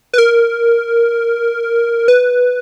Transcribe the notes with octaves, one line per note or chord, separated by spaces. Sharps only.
B4
A#4
B4